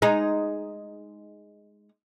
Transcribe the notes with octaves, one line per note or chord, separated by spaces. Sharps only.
G#3 D#4